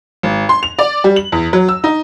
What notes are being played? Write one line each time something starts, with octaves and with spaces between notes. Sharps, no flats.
G#1
C6
F7
D5
G3
F#7
E2
F#3
E6
D#4